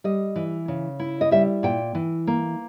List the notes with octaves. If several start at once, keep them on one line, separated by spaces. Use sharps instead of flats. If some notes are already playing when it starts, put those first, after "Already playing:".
G3 D#5
E3
C#3
E4
D#5
G3 E5
A#2 G5
E3
A#3